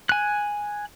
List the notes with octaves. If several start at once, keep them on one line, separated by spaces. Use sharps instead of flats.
G#5 F#6